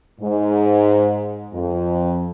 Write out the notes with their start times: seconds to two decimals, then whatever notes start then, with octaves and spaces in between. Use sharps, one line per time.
0.21 G#2
1.54 F2